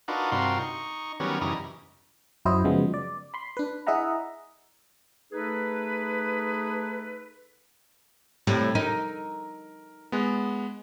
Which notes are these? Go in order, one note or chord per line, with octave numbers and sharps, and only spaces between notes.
D4 D#4 F4 F#4 A#4 B4
G2 C3 F4 F#4 A#4 C6
D#4 C#6
D#3 F#3 G3 B3 C#4 A#4
F#2 C#3 E3 G3 D#5 A#5
F#2 F#3 E4 C5 D#5
C#3 F3 F#3 G#3 B3
D5
B5 C6
D4 B4
E4 G#4 D#5 E5 F#5 A#5
A3 D#4 G#4 A4 B4
A2 C3 G3
D#4 A#4
G#3 B3